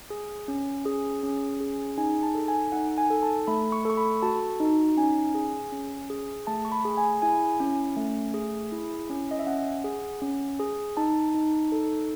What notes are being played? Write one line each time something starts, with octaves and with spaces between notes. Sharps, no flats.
G#4
C#4
G#4
C#4
G#4
D#4 G#5
A5
A4
G#5
D#4 F#5
G#5
A4
A5
A3 B5
C#6
A4 C#6
B5
F#4 A5
D#4
C#4 G#5
G#4
C#4
G#4
A3 A5
C#6
B5
G#4
G#5
E4 G#5
C#4
A3
G#4
E4
C#4
D#5
E5
C#4 F#5
G#4
C#4
G#4
D#4 A5
D#4
A4